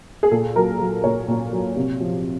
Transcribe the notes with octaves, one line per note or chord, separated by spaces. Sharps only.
G#4
A#2 A4
F#3 A#4
F#3
A#2 C#5
A#2
F#3
C3
F3